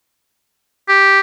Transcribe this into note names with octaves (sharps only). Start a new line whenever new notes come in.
G4